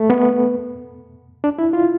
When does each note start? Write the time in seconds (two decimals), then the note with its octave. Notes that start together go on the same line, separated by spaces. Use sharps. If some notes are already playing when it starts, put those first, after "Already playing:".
Already playing: A3
0.10 B3
1.44 D4
1.59 E4
1.73 F4